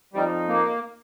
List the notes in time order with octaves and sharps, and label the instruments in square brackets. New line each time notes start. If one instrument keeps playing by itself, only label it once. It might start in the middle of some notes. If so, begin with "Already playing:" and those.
[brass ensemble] F2 F3 D#4 [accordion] G3
[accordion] A#3